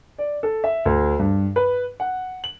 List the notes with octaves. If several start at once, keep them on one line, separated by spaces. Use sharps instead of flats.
D5
A4
E5
D2
G2
B4
F#5
F#7